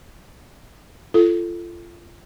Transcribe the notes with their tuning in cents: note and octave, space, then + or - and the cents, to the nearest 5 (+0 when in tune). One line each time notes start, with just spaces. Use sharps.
F4 -25 A4 -5